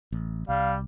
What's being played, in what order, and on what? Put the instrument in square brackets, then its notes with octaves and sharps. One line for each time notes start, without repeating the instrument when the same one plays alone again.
[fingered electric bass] A1
[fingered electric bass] C2 [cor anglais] G3 [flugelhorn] F5